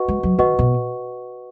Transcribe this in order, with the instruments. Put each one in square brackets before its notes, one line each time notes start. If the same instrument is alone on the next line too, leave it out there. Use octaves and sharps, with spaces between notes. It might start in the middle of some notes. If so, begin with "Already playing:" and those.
Already playing: [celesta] F#4 B4 D#5 F#5 C#6
[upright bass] G#3
F#3
[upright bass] D#3 [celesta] F#4 B4 D#5 F#5 C#6
[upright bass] B2